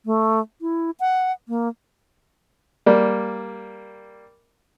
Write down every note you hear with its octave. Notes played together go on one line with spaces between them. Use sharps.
A3
E4
F#5
A#3
G3 A#3